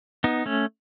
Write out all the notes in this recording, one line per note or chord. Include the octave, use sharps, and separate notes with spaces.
B3 D#4
A3 C#4